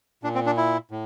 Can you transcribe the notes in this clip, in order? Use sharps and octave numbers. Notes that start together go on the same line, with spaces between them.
A#2 D4
C4
D4
E4
A2